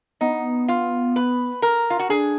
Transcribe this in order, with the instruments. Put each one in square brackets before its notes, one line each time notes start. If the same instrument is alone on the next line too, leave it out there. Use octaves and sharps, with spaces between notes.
[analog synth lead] B3 [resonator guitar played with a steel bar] D#4
[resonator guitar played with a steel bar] F4
B4
A#4
F4
F#4
[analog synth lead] D4 [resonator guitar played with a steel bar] G#4